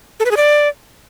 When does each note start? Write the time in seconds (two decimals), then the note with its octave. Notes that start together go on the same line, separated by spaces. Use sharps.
0.20 A4
0.25 B4
0.31 G#4
0.37 D5